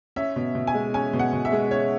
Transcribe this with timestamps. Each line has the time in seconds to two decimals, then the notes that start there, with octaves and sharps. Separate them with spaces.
0.16 C#4 E5
0.36 B2
0.55 B2
0.67 G#5
0.74 G#3
0.94 C#4 G#5
1.13 B2
1.19 F#5
1.33 B2
1.45 E5
1.52 G#3
1.71 C#4 C#5